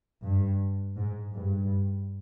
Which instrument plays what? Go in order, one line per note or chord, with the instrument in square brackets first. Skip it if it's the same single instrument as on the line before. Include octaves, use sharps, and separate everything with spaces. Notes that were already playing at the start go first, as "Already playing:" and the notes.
[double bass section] G2
G#2
G2